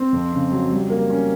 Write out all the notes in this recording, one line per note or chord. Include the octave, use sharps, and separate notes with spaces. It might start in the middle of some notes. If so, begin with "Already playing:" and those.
Already playing: C4
F2
C#3
F#3
G3
A#3
C#4